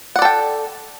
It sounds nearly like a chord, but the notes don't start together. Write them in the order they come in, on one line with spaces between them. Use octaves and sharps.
F#5 D5 A4 G5